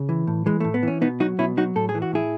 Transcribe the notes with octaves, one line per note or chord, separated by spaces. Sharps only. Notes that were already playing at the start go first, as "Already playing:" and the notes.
Already playing: C#3
E3
A2
E3 G#3
A2 A3
B3
E3 C#4
B2 B3 D#4
F#3 D#4 F#4
B2 C#4 E4
F#3 D#4 F#4
A2 A4
G#4
E3
F#4
A2 E4 G#4